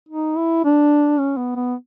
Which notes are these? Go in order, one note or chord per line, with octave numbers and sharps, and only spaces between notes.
D#4
E4
D4
C#4
B3
B3